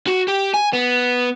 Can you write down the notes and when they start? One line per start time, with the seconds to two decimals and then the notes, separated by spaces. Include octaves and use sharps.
0.08 F#4
0.28 G4
0.54 G#5
0.73 B3